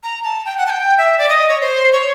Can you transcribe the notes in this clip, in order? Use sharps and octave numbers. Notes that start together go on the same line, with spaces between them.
A#5
A5
G5
F#5
A5
G5
E5
D5
D#5
C#5
C5
C#5